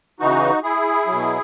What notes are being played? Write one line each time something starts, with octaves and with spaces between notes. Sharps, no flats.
C#3 E3 D#4 F#4
E4 G#4
B2 F#3